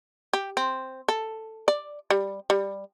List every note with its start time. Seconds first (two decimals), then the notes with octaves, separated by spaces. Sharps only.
0.33 G4
0.57 C4
1.08 A4
1.68 D5
2.10 G3
2.50 G3